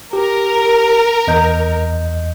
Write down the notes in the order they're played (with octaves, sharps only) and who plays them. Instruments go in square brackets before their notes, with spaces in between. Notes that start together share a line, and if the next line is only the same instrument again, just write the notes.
[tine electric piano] G4 [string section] A#4
[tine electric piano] E2 D#5 G6